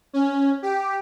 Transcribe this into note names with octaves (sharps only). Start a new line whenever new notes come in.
C#4
G4